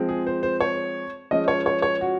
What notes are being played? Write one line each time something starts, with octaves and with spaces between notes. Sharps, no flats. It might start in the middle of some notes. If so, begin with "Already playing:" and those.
Already playing: F3 G#3 C4
G#4
C5
C5
C#5
F3 G#3 C#4 D#5
C#5
C#5
C#5
F#4